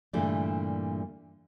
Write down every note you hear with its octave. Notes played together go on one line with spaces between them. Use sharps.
G2 A#2 D3 E3 G3 A3